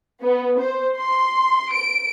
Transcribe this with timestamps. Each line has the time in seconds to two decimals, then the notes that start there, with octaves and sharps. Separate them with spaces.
0.22 B3
0.60 C5
0.97 C6
1.72 D7